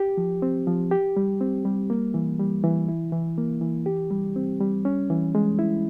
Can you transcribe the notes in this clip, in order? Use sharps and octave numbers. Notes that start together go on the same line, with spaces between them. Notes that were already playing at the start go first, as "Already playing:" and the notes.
Already playing: G4
F3
C4
F3
G4
G3
C4
G3
A#3
E3
G3
E3
E4
E3
A#3
E3
G4
G3
C4
G3
C#4
E3
G#3
E4